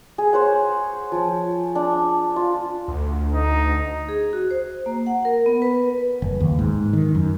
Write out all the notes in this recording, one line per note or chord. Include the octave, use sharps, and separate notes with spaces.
G#4
C5 C#5 F#5
F3
D4
F4
D2
D#4
G#4
F#4
C5
A#3
F#5
A#4
B3
B4
F#1
D#2
G#2
D#3
F#2